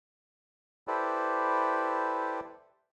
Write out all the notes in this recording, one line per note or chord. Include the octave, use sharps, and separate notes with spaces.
E4 G4 A4 B4 C5 D5